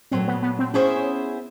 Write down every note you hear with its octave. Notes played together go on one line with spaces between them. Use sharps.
A#2 F#3 A3 C4
B3
B3
C4
B3 C#4 E4 G#4 C5 E5